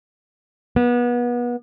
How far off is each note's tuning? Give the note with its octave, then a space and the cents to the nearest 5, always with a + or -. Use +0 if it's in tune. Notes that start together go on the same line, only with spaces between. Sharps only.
B3 -30